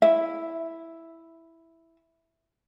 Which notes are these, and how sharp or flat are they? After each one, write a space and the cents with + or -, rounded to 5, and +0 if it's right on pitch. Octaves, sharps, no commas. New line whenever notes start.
E4 +0 E5 +0